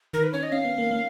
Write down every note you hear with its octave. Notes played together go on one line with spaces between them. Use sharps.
D#3 A#4
B4
C#4 C#5
D#5
C#4 F5
B3
A#3
A#3